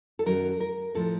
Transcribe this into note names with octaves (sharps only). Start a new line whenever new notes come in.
A4
F#2 D#3 F#3 A#4
A#4
A2 F3 G#3 A4